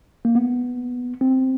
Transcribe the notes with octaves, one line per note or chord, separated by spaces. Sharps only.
A#3
B3
C4